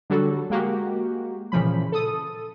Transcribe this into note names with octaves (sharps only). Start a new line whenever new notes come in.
D3 F#3 G3 F#4 A4
G#3 A#3 F#4 G4
A#2 C#3 E3 F3 B5
A4 D#6